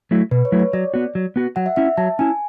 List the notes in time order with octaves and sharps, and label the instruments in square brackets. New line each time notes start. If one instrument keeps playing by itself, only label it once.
[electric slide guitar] F#3 A3 E4
[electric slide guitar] B2 [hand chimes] B4
[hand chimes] C#5
[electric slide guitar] F#3 A3 E4
[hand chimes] C#5
[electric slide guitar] F#3 [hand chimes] D5
[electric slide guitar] B3 F#4
F#3
B3 F#4
[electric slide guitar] F#3 [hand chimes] F#5
[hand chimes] E5
[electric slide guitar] C#4 E4 [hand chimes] E5
[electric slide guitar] F#3 [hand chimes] A5
[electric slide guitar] C#4 E4 [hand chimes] G#5